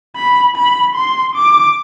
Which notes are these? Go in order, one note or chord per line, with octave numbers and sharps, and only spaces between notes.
B5
B5
C6
D6